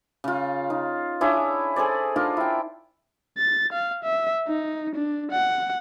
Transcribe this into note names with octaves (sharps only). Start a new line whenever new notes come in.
C#3 F4
D#4
D4 E4 G#4 C#5
G#4 A4 C5 D5
D4 D#4 F4 A#4
E4 G5
A6
F5
E5
D#4
D4
F#5